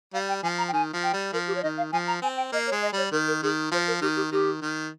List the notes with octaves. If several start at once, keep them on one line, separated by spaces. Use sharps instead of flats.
G3 F5
G5
F3 G#5
A#5
G5
D#3 G#5
F3
G5
G3
F3 A#4
G4
C#5
D#3 D#5
F5
F3 G#5
A#5
C4 G#5
G5
A#3 D#5
C#5
G#3
D#5
G3 C#5
D#3 A#4
A#4
D#3 G#4
F3 C5
A#4
D#3 G4
G4
D#3 G4
D#3